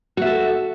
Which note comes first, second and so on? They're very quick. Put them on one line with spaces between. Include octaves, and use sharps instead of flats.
F#4 E5 A4